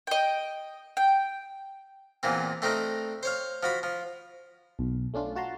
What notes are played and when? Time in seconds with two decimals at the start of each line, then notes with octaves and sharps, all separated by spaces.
0.07 D#5 G5
0.97 G5
2.23 E2 A#2 E3 C4
2.62 A3 C4 D4 D#4 A#4
3.23 C5 C#5 F5
3.63 F3 F#4 B5
3.83 F3
4.79 B1
5.14 A3 C#4 D4 F4
5.35 F4 F#4 A5 A#5 C6